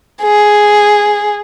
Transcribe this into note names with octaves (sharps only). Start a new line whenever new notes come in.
G#4